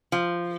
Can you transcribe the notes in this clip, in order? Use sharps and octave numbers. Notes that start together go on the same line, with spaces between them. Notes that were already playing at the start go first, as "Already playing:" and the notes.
F3